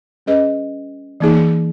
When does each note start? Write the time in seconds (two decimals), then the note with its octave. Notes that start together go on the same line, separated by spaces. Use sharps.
0.26 G3 C#4 G#4 B4 D#5
1.20 E3 A#3 D#4 G#4